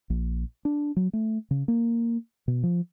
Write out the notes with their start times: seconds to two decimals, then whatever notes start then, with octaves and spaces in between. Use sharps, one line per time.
0.10 A#1
0.65 D4
0.96 F#3
1.13 A3
1.51 C#3
1.68 A#3
2.48 B2
2.63 F3